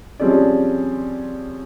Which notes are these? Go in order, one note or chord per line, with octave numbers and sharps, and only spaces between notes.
F3 G3 C4 C#4 G#4 D5